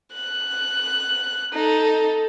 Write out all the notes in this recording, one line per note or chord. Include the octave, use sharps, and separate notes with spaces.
F#6
D#4 A4